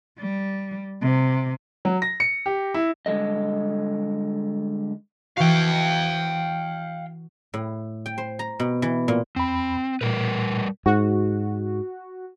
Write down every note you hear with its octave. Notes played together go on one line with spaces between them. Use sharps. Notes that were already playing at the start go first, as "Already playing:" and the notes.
G3
C3
F#3
A#6
C#7
G4
E4
D3 G3 G#3 A4 D#5
E3 F#4 F5 G5
A2
G5
C5
A#5
B2
E3
A#2
E2 C4 B5
A#2 G3 A#4 B4
G#2 F#4